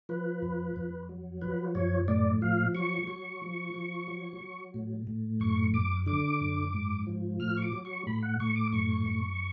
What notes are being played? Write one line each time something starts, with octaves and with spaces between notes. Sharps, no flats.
F3 B4
F2
F2
F#3
F3 B4
F#2 C#5
A2 D5
F3 F5
F#3 C#6
F#3
F3
F3
F#3
F#3
A2
A2
F#2 C#6
F#2 D6
D3 D6
F#2
G#2
F3
A2 F6
C#6
D6
F#3
C#6
A2 B5
F#5
A2 C#6
D6
F#2 C#6
F#2